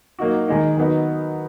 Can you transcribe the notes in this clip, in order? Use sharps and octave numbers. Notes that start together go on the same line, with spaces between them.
F#3 A#3 D#4 F#4
D#3 G#3 D#4
D#3 F#3 B3 D#4